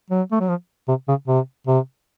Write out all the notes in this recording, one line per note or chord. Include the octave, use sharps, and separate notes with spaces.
F#3
A3
F#3
F3
C3
C#3
C3
C3